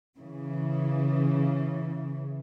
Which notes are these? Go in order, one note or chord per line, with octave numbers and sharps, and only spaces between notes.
C#3 E3